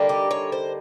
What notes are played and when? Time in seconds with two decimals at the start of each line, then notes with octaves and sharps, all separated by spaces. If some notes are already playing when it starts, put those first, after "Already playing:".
Already playing: D3 G3 A#3 D#4
0.09 G4
0.31 C#5
0.52 C5